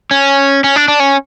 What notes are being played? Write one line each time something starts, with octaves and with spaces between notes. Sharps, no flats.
C#4
C#4
D4
D4
C#4